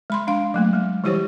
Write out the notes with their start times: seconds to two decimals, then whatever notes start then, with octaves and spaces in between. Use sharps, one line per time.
0.10 G#3 B5 C6
0.27 D4 F5 C6
0.54 F#3 A3 A#3
0.73 G#3
1.04 E3 G3 E4 G4 C5 C#5